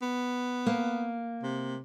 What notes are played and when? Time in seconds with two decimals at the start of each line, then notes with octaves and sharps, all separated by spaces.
0.02 B3
0.66 A#3
1.43 C3